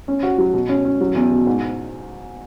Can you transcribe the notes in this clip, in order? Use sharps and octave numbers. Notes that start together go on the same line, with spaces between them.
C#4
F#4
F#3
B2
C#4
C#4
F#3
E2
B2
G#2